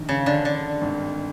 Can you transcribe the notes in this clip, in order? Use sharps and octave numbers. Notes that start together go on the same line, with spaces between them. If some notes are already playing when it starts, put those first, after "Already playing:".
Already playing: A#1 G#2 D#3
C#3
D3
D3
G#1 G2 D#3